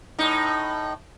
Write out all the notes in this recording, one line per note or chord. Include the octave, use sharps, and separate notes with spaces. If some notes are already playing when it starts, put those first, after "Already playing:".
A2 D#4